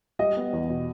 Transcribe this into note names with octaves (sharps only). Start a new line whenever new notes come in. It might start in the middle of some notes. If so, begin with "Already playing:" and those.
G3 D#5
B3
E2
B2